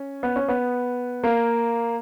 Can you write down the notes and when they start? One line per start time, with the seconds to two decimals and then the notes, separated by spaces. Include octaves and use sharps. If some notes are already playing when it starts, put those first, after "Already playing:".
Already playing: C#4
0.23 B3
0.36 C#4
0.48 B3
1.24 A#3